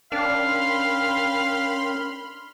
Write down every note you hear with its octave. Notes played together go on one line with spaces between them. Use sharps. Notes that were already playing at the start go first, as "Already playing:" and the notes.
C#4 D4 A#4 F5 G5 B5 C6 F6